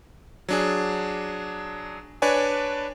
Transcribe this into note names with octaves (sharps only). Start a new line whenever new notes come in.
F#3 D4 G#4
D4 B4 C#5 D5 G#5